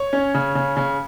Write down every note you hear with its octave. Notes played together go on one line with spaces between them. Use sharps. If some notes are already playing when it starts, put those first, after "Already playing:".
Already playing: C#5
C#4
C#3
C#3
C#3